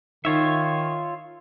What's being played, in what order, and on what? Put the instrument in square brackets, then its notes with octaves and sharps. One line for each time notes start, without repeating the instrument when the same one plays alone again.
[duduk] D#3 [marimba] D#4 [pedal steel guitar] F4 C#5 E5